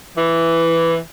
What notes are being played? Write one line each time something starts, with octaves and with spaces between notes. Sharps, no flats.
E3